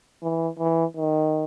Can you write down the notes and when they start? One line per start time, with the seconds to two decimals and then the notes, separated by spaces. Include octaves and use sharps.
0.22 E3
0.59 E3
0.97 D#3